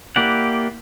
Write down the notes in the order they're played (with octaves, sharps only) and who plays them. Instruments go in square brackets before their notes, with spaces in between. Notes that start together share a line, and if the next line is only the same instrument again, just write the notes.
[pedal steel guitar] A#3 E4 G4 D5 F#5